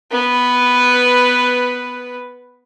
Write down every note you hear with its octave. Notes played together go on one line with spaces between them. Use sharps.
B3 B4